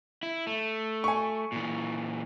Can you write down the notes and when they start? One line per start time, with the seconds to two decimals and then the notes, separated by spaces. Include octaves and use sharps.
0.23 E4
0.47 A3
1.04 G#5 C#6
1.52 A#2 E3